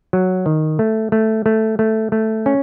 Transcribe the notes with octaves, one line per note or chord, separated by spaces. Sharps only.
F#3
D#3
A3
A3
A3
A3
A3
C#4